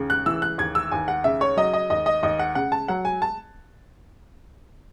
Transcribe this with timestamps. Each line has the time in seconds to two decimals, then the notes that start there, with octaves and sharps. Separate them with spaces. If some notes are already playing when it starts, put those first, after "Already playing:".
Already playing: D#2 C#3
0.10 F#6
0.26 E3 E6
0.42 F#6
0.58 D#2 G#6
0.75 E6
0.91 D#2 G#5
1.08 F#5
1.24 C#3 E5
1.41 C#5
1.57 F#3 D#5
1.74 D#5
1.90 D#2 D#5
2.06 D#5
2.23 D#2 D#5
2.39 F#5
2.55 C#3 F#5
2.72 A5
2.88 F#3 F#5
3.05 G#5
3.22 A5